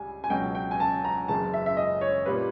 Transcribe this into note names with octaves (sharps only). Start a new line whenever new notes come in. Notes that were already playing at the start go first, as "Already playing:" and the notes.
Already playing: C#2 G3 G#5
G#5
C#2 B2 F#3 G5
G5
G#5
A5
A#5
F#1 F#2 C#3 E3 A5
E5
E5
D#5
C#5
A#2 G3 B4